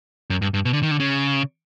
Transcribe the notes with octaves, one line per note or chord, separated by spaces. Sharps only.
F#2
G2
G2
B2
D3
D#3
D3
C#3